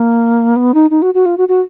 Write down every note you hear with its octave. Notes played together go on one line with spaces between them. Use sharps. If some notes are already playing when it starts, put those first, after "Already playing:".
Already playing: A#3
B3
D#4
D#4
F#4
F#4
F4
F#4
F#4